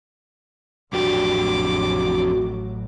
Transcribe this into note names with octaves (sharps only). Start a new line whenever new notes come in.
A1 F2 A2 F#3 D4 F#4 G4 D6